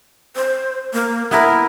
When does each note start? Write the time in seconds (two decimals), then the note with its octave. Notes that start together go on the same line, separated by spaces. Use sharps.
0.36 C5
0.94 A#3
1.31 B3 E4 A#4 E5